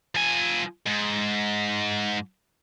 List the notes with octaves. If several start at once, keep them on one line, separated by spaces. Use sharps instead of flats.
F3 G#5
G#2